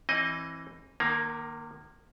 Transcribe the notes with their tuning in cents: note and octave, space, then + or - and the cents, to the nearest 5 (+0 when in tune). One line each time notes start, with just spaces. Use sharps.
E3 +5 C4 +40 D#5 +0
D#3 -40 A#3 +5